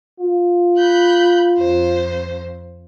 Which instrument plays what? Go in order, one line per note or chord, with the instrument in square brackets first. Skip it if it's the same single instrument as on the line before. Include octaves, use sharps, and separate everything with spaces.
[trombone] F4
[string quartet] B5 F#6 G6
F2 C5